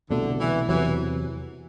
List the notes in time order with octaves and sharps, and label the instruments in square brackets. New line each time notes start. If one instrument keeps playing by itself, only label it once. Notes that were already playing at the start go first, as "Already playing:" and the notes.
[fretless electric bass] C2 B2 A3 [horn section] D3
[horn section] E3
[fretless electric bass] E2 C3 F#3 [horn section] E3